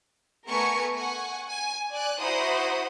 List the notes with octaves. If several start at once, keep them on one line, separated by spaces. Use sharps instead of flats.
A3 B3 A#4 G#5 C#6 C#7
F#5 G#5 C#6
G#5
D5 G#5 F#6
E4 F#4 C5 F#5 A#5 D#6